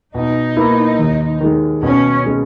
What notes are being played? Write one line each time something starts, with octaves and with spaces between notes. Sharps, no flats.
B2 D#4
A#3 E4 B4
D#2
D#3 G#3
B2 C#4
G#3 C#4